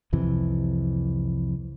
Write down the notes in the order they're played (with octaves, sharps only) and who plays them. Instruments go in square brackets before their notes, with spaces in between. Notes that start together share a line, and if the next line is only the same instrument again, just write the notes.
[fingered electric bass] C2 F2 C3 E3